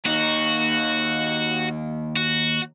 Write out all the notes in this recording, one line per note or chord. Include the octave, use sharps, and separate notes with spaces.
D#2 D#4 F#4
F#4